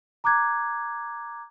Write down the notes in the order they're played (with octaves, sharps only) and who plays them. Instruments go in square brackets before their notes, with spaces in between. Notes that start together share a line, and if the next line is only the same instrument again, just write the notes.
[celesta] A#5 D6 F#6 G#6